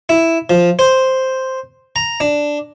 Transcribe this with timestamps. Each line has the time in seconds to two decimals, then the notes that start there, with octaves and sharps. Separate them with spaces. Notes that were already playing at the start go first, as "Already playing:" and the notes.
0.09 E4
0.50 F3
0.79 C5
1.96 A#5
2.20 D4